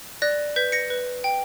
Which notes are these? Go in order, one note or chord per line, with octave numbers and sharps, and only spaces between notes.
D5 F#6 A#6
B4 G6 B6
A#6 C#7
B4
G5